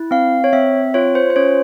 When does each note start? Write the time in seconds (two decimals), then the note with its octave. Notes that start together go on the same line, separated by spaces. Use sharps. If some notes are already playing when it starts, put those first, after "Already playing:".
Already playing: E4
0.11 C4 F5
0.44 C#5
0.53 C4 E5
0.94 F4 C#5
1.15 C5
1.30 C5
1.36 C#4 C#5